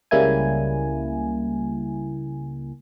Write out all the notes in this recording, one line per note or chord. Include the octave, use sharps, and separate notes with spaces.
C#2 C#3 G3 A#3 E4 G#5